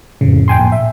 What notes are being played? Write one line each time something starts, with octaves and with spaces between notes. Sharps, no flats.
F2 A2 C#3
G5 G#5 C6
A#1
E5